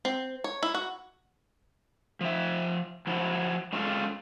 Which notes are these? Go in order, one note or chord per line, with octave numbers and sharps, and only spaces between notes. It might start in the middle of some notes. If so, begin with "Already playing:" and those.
C4
C#5
E4
F#4
F3 E5
F3 F#3 E4
G#3 C#4 F4 A4